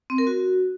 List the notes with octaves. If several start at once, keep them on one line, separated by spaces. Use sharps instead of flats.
C4
A#4
F#4